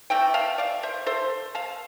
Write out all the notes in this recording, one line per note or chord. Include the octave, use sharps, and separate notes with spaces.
E3 A3 C4 E5 G5
F5 A5
D5 F5
C5 E5
A4 C5
F5 A5